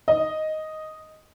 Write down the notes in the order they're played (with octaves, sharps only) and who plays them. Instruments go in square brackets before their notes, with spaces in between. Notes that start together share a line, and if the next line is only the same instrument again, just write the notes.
[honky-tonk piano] D#5